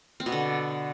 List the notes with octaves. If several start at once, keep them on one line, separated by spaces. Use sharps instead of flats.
C4
B2
D3